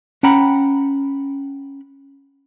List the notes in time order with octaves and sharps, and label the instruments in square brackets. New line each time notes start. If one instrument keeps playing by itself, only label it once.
[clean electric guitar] C#4 F#5 G5 A#5 B5